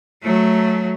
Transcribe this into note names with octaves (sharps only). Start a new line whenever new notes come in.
F#3 A3